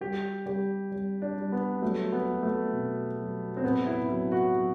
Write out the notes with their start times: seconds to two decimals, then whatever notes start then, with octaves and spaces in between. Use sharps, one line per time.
0.01 G3 G4
0.46 G3 G4
0.92 G3
1.22 D4
1.38 G3
1.52 B3
1.82 F#3 A3
2.12 B3
2.27 F#3
2.43 A3
2.73 B2
3.19 F#3
3.57 C4
3.63 A2 B3
3.86 E4
4.09 F#3 E4
4.32 F#4
4.55 F#3